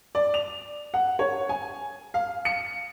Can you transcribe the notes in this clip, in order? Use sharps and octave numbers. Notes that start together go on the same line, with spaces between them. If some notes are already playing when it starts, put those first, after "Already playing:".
D5
F7
F#5
C#5
G#5
F5
C#7